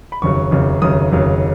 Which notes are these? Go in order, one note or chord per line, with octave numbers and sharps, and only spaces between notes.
B5
F1 D#2 C#3 F#3 C#6
F1 D#2 C#3 F#3
F1 D#2 C#3 F#3 D#6
F1 D#2 C#3 F#3